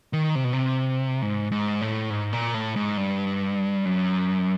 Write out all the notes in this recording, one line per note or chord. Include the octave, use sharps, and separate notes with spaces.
D#3
C3
B2
C3
G#2
G#2
A2
G#2
A#2
A2
G#2
G2
F#2